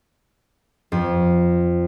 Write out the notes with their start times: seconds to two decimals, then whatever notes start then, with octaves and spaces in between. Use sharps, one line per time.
0.92 F2